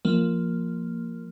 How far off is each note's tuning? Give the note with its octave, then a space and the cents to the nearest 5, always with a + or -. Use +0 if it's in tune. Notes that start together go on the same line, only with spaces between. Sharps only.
F3 -5 A#3 -5